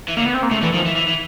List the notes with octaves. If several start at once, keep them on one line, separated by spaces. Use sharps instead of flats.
E3
D3 A#3
B3
C4
A#3
C#3 A3
D3 E3
D#3 F3
E3
E3
E3